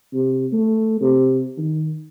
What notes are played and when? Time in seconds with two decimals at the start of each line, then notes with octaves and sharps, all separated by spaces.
0.13 C3
0.53 A3
1.01 C3
1.58 D#3